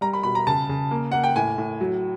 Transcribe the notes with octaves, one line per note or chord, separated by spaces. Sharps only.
G3 A#5
B5
B2 B5
A#5
C#3 A5
C#3
A#3
A#3 F#5
G5
A2 G#5
A2
F#3